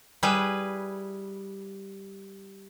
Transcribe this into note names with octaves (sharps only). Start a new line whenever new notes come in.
G3 E4 G#4 B4